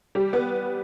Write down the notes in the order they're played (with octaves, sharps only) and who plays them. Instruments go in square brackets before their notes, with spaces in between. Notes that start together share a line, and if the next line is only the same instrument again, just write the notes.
[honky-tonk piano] G3 G4
B3 B4